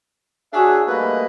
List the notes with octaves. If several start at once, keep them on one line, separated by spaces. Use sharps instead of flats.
D4 F#4 G#4 C#5 E5
G3 A3 A#3 B4 D#5 B5